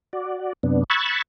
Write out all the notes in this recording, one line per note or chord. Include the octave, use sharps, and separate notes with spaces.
F#4 D5
F#2 C3 B3 D4
B5 C#6 E6 F#6 G#6 A6